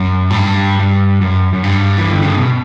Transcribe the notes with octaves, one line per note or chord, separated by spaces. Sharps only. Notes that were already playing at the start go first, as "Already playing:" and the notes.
Already playing: F#2
A2
G2
G2
F#2
F#2
G2
E3
D3
C#3
B2